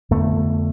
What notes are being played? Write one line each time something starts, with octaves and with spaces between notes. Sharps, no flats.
F2 D3 A3 B3